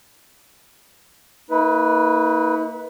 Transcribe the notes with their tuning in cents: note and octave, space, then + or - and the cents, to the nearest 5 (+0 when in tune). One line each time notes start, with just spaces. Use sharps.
A#3 -20 D#4 +45 B4 +0